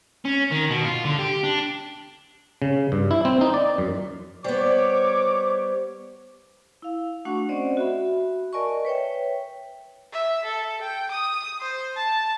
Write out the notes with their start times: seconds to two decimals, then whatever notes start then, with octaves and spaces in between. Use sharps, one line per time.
0.25 C#4
0.51 D#3
0.70 B2
0.84 F4
1.05 D3
1.19 G4
1.43 D4
2.62 C#3
2.92 G2
3.11 E4
3.25 C4
3.41 D#4
3.54 D5
3.78 F#2
4.44 G3 B3 C5 C#5 D6
6.82 E4 F5
7.25 A3 D4 F#4 F#5 C#6
7.49 C4 C#4 C5 D5 D#5 F#5
7.77 F#4 E5 B5
8.53 A#4 D5 D#5 G#5 A5 C#6
8.85 B4 C#5 E5 G5
10.12 E5
10.45 A4
10.81 G5
11.11 D#6
11.61 C5
11.96 A5